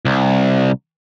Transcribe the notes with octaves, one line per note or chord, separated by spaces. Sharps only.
C2